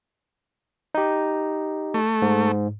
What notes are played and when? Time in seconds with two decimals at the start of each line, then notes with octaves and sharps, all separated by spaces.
0.95 D#4 G4
1.94 A3
2.22 G#2